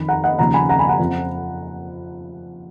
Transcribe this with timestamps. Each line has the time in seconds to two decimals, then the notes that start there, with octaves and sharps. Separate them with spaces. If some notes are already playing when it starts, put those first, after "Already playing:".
Already playing: F2 D#3 B5
0.09 F#5 A#5
0.24 D#5 F#5
0.38 D#2 C#3 F3 F#5 A#5
0.54 G#5 B5
0.69 F#5 A#5
0.79 G#5 B5
0.89 F#5 A#5
0.99 F2 F3